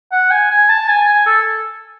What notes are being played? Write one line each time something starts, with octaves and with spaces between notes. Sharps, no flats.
F#5
G#5
G#5
A5
G#5
G#5
A4